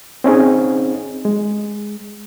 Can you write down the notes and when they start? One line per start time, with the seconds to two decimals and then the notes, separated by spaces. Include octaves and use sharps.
0.24 C4 C#4 D#4 G#4
1.25 G#3